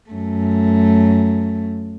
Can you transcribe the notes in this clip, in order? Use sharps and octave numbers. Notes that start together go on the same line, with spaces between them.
F#2 A3